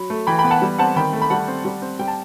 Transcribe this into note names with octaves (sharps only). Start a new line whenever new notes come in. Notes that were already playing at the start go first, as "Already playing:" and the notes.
Already playing: F#3 B5
A3
E3 G5 B5
G5 B5
B3
F#5 A5
G3
C4 F#5 A5
D#3 G5 B5
A3
B5
G3 F#5 A5
C4
G3
C4
G3 G5
A5